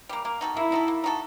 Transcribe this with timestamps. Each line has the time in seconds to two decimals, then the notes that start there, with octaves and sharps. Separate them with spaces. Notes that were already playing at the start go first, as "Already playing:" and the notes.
0.09 G3 A#3
0.25 A#3
0.41 D#4 F#4 A4
0.56 A#3 E4
0.72 D#4 F#4 A4
0.88 A#3
1.04 D#4 F#4 A4